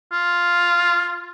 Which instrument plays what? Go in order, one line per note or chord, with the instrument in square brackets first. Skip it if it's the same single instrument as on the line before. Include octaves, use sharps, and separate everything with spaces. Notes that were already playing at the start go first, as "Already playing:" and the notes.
[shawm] F4